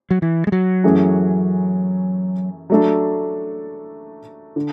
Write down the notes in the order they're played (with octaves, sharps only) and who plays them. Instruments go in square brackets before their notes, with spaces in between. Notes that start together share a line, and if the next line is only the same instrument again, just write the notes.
[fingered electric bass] F#3
E3
G#3
F#3
[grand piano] F#2 E3 A3 C#4 G#4
F#3 A3 D4 A4
D3